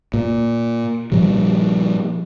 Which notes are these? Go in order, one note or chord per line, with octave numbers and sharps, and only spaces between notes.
A#2
A#2 F3 G3